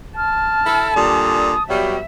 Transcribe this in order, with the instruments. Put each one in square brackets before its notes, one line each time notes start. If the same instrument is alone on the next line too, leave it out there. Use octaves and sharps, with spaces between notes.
[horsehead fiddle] A5 [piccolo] F6
[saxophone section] E4 A4
[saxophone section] A#2 D3 G3 [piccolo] D#6
[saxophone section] B2 F#3 G3 [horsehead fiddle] E5 [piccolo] G5